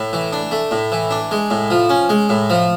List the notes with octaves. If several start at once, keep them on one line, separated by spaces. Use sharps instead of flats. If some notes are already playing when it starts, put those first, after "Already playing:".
Already playing: A2
E3
D4
A3
A2
E3
D4
G#3
A2
F3
C#4
G#3
A2
F3